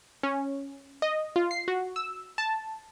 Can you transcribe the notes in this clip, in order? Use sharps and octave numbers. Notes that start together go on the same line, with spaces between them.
C#4
D#5
F4
C7
F#4
E6
A5